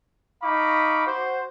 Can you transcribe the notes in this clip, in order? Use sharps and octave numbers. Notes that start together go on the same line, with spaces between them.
D#4 F5 B5 C#6 D6
F#4 C5